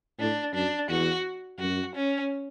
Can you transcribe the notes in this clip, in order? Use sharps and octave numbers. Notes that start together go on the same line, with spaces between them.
A2 D4
F#2 D4
E2 F#4
F#2 F#4
C#4